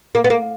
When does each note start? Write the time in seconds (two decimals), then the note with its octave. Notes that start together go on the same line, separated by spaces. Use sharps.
0.15 A#3
0.24 B3
0.30 A#3